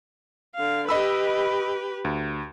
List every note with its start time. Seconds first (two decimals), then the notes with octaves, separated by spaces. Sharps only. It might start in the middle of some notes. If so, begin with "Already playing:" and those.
0.55 D3 F5
0.89 G4 B4 D#5 B5 E6
2.05 D2